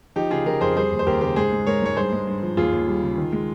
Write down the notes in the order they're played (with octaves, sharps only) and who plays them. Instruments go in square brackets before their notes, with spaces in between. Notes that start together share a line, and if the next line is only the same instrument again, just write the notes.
[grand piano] F3 D#4 G4
C#3 F4 G#4
F3 G4 A#4
F2 G#4 C5
G3 G#4 C5
D#2
C5
D#2 G4 A#4
C#3 G4 A#4
G#2 G#4 C5
G#3
G#2 A#4 C#5
G#2 C#5
G2 G#4 C5
G#3
G2
F3
D#2 F4 G#4
D#2
G3
C#3
D#3
G#3